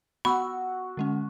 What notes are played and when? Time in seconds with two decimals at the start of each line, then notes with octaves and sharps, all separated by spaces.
0.25 B3 F#4 B5 E6
0.97 D3 G#3 C#4